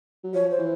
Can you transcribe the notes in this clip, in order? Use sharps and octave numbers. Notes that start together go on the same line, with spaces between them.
F#3
F3 C#5
C5
E3